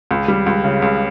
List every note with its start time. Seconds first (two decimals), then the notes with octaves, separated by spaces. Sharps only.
0.11 C#2
0.28 G3
0.46 C#2
0.64 C#3
0.82 C#2